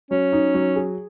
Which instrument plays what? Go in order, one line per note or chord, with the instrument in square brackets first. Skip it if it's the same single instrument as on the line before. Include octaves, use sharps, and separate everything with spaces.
[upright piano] F#3 [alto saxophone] C#4
[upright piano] D#4
F#3
G#4